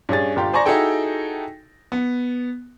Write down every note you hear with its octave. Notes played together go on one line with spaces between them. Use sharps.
G2 C#4 G#4 A6
G1 F4 G4
C5 D5 G#5 A#5 C#6 A#6
D#4 E4 F#4 G#4 A4 G5
B3